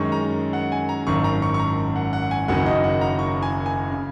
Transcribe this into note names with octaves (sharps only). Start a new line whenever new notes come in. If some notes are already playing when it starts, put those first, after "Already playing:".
Already playing: F#2 D#3 G#3 C#4 C#6
A#5
F#5
G#5
A#5
G#1 F#2 D#3 C#6
A#5
C#6
C#6
A#5
F#5
F#5
G#5
F#1 F#2 D#3 F#3 C#4 F#5
D#5
F#5
A#5
C#6
G#5
G#5
C#3